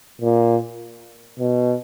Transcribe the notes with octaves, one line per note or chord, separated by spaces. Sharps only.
A#2
B2